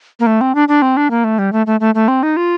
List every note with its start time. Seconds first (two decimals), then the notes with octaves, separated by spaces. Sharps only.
0.20 A#3
0.26 A3
0.41 C4
0.55 D4
0.68 D4
0.82 C4
0.97 D4
1.11 A#3
1.24 A3
1.39 G3
1.53 A3
1.66 A3
1.80 A3
1.95 A3
2.08 C4
2.23 D#4
2.37 F4